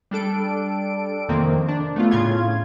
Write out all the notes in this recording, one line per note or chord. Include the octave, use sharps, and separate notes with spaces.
G3 D4 A4 D7
F2 C3 D#3 A#3 C4
D4
A3 B3 F4
A2 C#3 F4 G#6